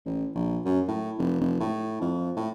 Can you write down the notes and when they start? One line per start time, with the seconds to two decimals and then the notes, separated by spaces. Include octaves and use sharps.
0.06 A1
0.35 A#1
0.65 F#2
0.88 A2
1.18 F1
1.41 F1
1.60 A2
2.01 F2
2.36 A2